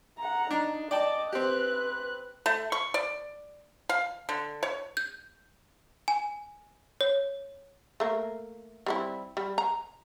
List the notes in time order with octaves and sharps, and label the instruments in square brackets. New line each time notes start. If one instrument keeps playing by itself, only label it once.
[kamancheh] F#5 A#5
[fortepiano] D4 [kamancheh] D#4
[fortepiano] D5 G5 A5 [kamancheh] D#5 D6
[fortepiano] C4 G4 [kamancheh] B4 F#6
[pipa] A3
C#6
D5
F5
D3
C#5
[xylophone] G6
G#5
C#5
[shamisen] A3 A#3
G3 C4 E4
G3
A#5